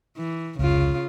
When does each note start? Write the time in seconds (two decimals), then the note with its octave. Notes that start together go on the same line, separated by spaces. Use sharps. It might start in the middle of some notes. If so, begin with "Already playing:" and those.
0.17 E3
0.59 F1 C#2 C#3 F4